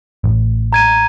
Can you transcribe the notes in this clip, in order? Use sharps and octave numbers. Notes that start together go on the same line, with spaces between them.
A1
A#5 G#6 D#7